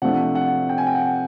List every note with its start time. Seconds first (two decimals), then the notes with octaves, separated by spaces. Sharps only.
0.02 C3 F3 A3 D4 F#5
0.35 F#5
0.69 G5
0.78 G#5
0.87 G5
0.95 F#5
1.03 G5